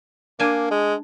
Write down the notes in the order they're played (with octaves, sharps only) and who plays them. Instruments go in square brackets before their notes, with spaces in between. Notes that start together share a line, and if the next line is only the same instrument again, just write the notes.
[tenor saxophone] A#3 [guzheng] D4 G#5
[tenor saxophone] G#3